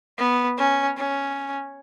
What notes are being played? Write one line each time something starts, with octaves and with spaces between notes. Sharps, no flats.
B3
C#4
C#4